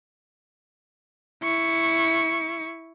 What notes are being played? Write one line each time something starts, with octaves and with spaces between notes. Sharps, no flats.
E4 C#6